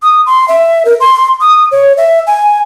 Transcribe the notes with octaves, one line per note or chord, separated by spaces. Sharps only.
D#6
C6
E5
A#4
C6
D#6
C#5
E5
G#5